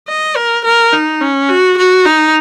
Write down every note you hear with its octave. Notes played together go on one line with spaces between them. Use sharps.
D#5
A#4
A#4
D#4
C#4
F#4
F#4
D#4